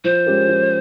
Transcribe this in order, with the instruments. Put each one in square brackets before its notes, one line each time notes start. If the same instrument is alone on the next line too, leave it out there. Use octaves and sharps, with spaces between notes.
[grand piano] F3 [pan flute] C5
[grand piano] G#3 C#4 G4 A#4
F3